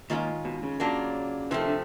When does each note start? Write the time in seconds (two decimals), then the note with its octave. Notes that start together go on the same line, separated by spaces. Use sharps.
0.10 A#2 D#3 G#3 C#4 F4
0.45 B2
0.63 C#3
0.80 F#3 A#3 D4 F4
1.51 C3 E3 F3 A3
1.59 D#3
1.66 D3